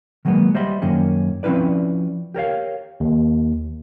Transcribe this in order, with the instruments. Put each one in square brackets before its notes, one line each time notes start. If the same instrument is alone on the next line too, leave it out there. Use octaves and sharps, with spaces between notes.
[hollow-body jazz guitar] D#3 F#3 G#3 A#3 B3
G3 C5 D#5 E5 B5 C6
F#2 D#3 A#3 C#4
F3 C4 C#4 E4 B4 D5
G4 A#4 C#5 F5
[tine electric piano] D#2